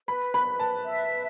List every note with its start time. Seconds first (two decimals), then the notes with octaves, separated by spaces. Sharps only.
0.08 B4 B5
0.34 B5
0.46 B4
0.60 A5
0.85 E5